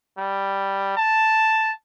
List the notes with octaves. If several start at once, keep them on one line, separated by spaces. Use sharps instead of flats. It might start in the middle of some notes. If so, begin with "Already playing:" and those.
G3
A5